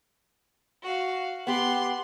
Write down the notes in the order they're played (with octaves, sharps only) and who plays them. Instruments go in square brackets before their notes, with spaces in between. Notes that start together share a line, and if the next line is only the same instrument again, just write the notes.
[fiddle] F#4 F5
[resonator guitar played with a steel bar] B3 G4 [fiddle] C6 F#6